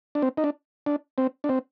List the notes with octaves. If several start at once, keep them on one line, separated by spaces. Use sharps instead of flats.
D4
C4
D#4
D4
D4
C4
D4
C4